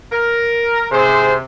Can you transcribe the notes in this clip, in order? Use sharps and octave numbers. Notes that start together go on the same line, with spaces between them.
A#4
C3 G#4 C5